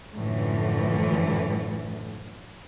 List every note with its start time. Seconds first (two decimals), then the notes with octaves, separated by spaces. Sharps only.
0.14 F#2 A2 D3 E3 F3